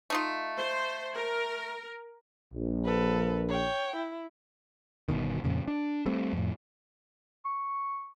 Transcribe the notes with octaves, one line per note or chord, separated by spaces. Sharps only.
A3 D#4 F4
C5
A#4
A#1
A4 B4
C#5 G5
E4
G1 C2 B2 D#3
F2 A#2 C#3
D4
G3 A3 C4
F2 A2
C#6